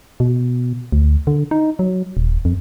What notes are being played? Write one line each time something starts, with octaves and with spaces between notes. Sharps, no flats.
B2
D2
D3
D#4
F#3
D#1
F2